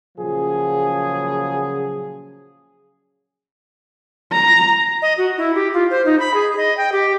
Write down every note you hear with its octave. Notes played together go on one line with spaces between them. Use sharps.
A#2 C#3 F3 F#3 G#4
A#5
D#5
F#4
E4
G4
F4
C5
D#4
B5
G#4
D#5
G5
G4